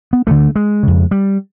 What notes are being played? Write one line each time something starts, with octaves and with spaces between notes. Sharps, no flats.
B3
D2 D3 A3
G#3
F2 C#3
G3